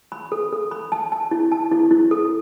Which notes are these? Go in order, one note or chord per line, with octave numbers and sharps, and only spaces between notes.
B5
A4
A4
B5
A5
A5
E4
A5
E4
E4
A4